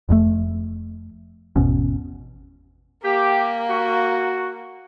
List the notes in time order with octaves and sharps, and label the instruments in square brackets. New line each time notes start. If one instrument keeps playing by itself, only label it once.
[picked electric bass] F1 F2 A2 A3
G#1 E2 B2 C#4
[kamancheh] A#3 [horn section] G4
[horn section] F#4